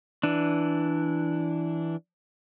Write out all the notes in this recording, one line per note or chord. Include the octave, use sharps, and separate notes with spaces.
E3 D4